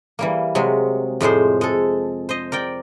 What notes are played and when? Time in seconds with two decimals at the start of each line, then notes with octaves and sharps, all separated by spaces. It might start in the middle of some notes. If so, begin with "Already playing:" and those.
0.19 E3 G3 A#3
0.55 C3 F#3 G#3
1.21 F2 A2 G#3 C5
1.61 G#3 A4
2.29 C5 D#5
2.52 A#4 D5 G5